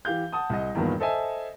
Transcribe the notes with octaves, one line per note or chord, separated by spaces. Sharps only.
E3 G4 F5 G6
F#5 A5 D#6
C2 D#5
E2 G2 A#2 D#3 A#3 B3
A4 C5 D#5 E5 G#5